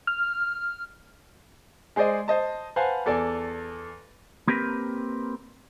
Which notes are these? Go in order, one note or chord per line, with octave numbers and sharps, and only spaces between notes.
F6
G#3 G#4 C5 D5 D#5
C5 D#5 A5
B4 C5 F5 F#5 G#5 A5
E2 A4 D5 G#5
A#3 C4 G4 A#4 B4